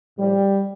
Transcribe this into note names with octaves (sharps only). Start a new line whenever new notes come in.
A2 F3 G3